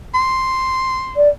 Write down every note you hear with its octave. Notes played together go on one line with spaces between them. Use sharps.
C6
D5